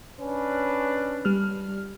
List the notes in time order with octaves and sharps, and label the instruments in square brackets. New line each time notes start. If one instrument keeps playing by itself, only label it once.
[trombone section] C#4 D4 B4
[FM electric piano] G3 F6